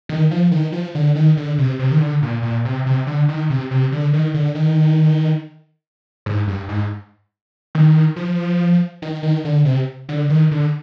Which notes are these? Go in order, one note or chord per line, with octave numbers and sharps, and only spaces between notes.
D#3
F3
D#3
F3
D3
D#3
D3
C3
C3
D#3
D3
A#2
A#2
C3
C3
D3
D#3
C3
C3
D3
D#3
D3
D#3
G#2
G2
G#2
D#3
F3
D#3
D#3
D3
C3
D3
D#3
D3